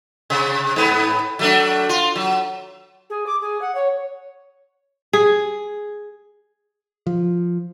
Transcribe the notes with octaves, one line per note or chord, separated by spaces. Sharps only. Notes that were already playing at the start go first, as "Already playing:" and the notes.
C3
G#2 B3
F#3 A3 D4
F4
F#3
G#4
D6
G#4
F#5
C#5
G#4
F3